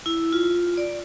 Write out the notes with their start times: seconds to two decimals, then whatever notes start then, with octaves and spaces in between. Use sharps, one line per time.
0.06 E4
0.33 F4
0.77 D5